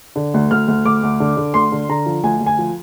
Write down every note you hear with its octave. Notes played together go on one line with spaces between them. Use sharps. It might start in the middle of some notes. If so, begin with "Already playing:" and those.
D3
D2
D2 F6
D2
D2 D6
D2
D3
D3
D2 C6
D3
D3 A#5
F3
D2 G#5
D2
G#5
F3